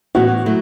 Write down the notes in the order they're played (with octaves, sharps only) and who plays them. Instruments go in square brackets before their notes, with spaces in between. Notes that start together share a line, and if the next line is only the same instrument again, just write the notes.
[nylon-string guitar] A2 E3 B3 [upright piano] F#4
[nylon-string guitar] F#3 A3 E4